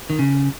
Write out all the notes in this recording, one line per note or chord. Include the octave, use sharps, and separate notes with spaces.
D#3
C#3